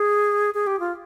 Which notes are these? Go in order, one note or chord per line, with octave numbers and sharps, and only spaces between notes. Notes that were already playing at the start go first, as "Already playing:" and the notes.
Already playing: G#4
G#4
G4
F4